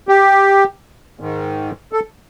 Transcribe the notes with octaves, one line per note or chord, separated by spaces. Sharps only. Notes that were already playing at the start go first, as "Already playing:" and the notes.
G4
G#2 D#3
A4